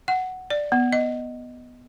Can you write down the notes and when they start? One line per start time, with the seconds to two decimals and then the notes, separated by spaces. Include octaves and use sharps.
0.08 F#5
0.50 D5
0.72 B3
0.93 D#5